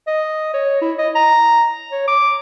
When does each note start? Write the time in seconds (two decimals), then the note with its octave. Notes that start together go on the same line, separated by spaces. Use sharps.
0.07 D#5
0.54 C#5
0.81 E4
0.99 D#5
1.15 A#5
1.92 C#5
2.08 D6